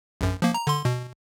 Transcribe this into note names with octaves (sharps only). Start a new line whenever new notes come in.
A#1 F#2
F3 A#3
A#5
D3 C6
B2